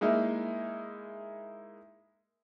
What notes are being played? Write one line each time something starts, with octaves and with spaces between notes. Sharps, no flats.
G#3 A#3 D#4 E4